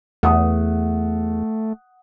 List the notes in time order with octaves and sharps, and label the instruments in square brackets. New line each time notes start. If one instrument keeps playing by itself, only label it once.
[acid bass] E2 [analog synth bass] A3 [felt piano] F#5 D#6